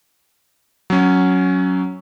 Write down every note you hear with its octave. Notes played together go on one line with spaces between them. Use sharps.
F#3 C#4